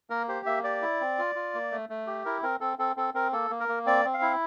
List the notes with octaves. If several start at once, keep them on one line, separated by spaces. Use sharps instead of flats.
A#3 A#4
G4 C5
A#3 E5
G4 D5
E4
C4
F4
F4
A#3
A3
A3
G4
E4 A#4
C4 A#4
C4 A4
C4 A4
C4 A4
C4 A#4
A#3 A4
A#3
A#4
A#3
C4 D5
C4
F5
E4